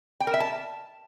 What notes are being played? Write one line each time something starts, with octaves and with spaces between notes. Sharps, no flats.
G5
A#4
E5
A5